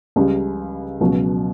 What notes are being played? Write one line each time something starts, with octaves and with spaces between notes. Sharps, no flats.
C#2 C#3 G3
C#2 B2 F#3